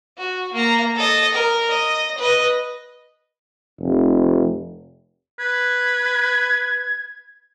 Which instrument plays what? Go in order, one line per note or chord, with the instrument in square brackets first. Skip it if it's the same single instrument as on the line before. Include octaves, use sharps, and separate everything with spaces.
[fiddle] F#4
A#3 A#5
A4 D#5
A#4
D#5
B4 D#5
[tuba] F1
[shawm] B4 [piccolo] G#6